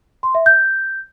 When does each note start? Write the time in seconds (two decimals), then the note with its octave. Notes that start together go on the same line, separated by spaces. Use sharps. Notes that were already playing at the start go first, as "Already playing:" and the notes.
0.23 C6
0.35 E5
0.46 G6